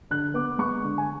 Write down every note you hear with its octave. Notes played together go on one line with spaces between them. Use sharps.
D3 F#6
B3 D6
G#3 C#6
D3
G#5